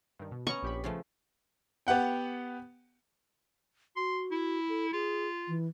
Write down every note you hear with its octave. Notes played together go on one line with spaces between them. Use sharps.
G2 D#3
B2
B3 C#4 A#5 C#6
A#1 G4 B5
C#3 F3 A3
B3 G4 F#5 G5
F#4 C6
E4
A4
F4 G#4
E3